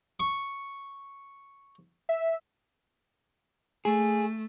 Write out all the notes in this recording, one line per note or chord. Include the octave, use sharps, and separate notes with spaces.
C#6
E5
A3 G#4